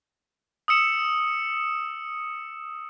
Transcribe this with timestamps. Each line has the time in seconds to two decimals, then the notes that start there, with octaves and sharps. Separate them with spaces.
0.68 D#6 E6 C#7 E7